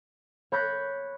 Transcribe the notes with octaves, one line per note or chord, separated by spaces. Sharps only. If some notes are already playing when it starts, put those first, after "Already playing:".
C#5 B5 F#6 G6 A#6 B6